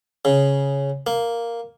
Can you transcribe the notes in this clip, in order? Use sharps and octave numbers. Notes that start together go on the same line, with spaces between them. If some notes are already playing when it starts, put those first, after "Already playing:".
C#3
A#3